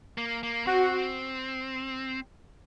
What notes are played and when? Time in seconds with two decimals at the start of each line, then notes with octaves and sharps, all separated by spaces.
0.18 A#3
0.43 A#3
0.67 C4 F#4